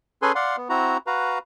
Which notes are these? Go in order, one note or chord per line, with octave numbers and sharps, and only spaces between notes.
C#4 G#4 A4 B4 G#5 C6
D5 F5 F#5 C6
B3
C4 E4 F#4 A#5
F#4 B4 F5 A#5